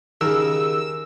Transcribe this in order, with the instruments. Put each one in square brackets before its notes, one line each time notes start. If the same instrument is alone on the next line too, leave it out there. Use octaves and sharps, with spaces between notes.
[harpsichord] D#2 [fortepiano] C#3 A#4 [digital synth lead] E6